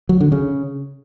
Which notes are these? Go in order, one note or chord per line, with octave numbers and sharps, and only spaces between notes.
F#3
D3
C#3